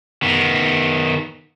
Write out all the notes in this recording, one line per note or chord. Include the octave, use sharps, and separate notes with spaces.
D#3 B3